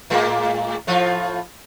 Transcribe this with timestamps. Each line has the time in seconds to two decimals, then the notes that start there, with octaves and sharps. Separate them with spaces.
0.10 A2 G#3 A#3
0.87 A2 F3 F4